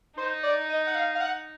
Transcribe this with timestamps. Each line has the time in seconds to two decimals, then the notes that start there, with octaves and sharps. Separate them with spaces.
0.17 D#4 C5
0.43 D5
0.69 D#5
0.87 F#5
0.95 F5
1.15 F5
1.21 F#5